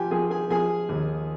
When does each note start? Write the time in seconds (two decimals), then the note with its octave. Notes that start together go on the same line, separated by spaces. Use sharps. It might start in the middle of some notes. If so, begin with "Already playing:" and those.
Already playing: F3 F4 G4 G5 G#5
0.11 F3 G#4 G#5
0.30 G#4 G#5
0.50 F3 G#4 G#5
0.89 D#2